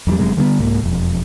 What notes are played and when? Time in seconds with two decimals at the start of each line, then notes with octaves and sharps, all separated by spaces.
0.07 F2 E3 G3
0.19 F1 F#2 C3 G#3
0.37 D3 G3 A3 B3
0.59 C2 G#2 A#3
0.84 E1 F2